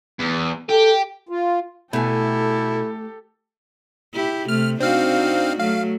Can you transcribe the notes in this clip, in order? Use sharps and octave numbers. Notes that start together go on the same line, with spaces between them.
E2
G4 A4
F4
B2 A3 E4 G4 A4 G#5
E4 G4
C3 A3 F6
C4 D4 D#4 F#4 F5
F#3 A3 F5